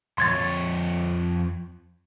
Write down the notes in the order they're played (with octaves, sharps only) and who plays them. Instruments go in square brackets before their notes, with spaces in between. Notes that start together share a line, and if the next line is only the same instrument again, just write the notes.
[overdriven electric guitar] F2 C#5 [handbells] C6 G#6 A6